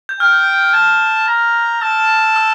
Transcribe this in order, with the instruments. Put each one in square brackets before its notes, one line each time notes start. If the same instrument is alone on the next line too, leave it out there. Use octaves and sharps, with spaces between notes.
[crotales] G6
[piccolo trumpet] G5 [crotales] F6
[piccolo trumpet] A5
A#5
[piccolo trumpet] A5 [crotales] E6
[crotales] E6
E6